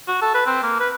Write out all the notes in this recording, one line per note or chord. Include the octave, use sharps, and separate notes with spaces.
F#4
A4
B4
C4
A#3
B4